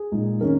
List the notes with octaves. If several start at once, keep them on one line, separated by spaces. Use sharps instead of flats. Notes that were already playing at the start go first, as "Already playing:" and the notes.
Already playing: G#4
A#2 G#3 D#4
D#3 G#3 C#4 A#4